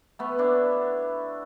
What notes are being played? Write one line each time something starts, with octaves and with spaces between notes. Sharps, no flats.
A3 B3
D4 E4